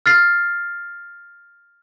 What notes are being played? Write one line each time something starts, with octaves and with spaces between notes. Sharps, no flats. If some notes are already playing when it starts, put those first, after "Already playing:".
F6 A6 C7